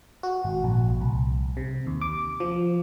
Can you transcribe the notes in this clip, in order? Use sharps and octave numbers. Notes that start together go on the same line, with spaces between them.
F#4
G#1
A#1
C2
C3
D#2
D6
F3